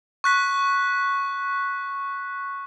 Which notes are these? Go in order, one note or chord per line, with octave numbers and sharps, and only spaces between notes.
C#6 F#6 B6